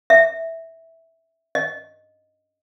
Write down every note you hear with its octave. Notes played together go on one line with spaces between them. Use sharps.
E5
D#5